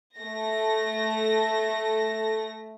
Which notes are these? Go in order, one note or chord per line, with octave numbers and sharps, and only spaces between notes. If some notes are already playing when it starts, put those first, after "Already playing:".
A3 A#6